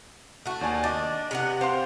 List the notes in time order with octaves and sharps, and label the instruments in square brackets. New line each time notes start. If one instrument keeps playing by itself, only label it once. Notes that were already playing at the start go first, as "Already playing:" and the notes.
[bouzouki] A3 F#4
[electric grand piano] D#2 D5 G#5
[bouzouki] D4 [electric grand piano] D#5 D6 A6
[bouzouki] C3 B3 F#5
[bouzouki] G4 [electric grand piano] C5 F5 C6